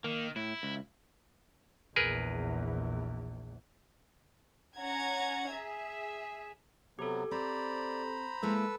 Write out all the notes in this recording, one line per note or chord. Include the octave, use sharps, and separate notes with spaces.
D#3 A#3
A2 E4
C#2
A#1 E2 G#4 A#4 B4
C#4 F#5 A#5 G#6
G#4 E5
C3 F#3 B3 G4 A4
C4 C5 D5 A#5 B5
G#3 A#3 E4 A4 B4 E6